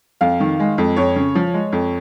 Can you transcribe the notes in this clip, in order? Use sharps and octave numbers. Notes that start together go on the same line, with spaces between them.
F2 F5
D#3
G#3
F2
F2 C#5
C#3
F3
G#3
F2